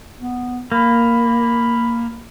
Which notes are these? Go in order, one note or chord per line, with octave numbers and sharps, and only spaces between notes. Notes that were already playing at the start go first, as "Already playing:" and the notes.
B3
A#3 B5